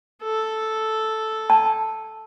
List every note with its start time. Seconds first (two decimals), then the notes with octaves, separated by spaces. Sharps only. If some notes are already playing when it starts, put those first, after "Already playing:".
0.23 A4
1.50 A5